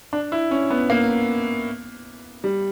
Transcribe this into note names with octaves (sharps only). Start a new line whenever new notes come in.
D4
E4
C#4
B3
A#3
G3